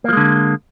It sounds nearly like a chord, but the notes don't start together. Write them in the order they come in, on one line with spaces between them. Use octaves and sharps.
A#3 F3 G#3 D3